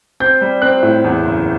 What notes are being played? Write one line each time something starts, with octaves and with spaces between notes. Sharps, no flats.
C4 G6
G3
C4 F#6
A2
E2
F#1